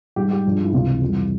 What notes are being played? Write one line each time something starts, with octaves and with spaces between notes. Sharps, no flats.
G#2 G3 G4
G4
G2 F3 G#3
E4
C#2 C3 E3 F4
F2 E3 G3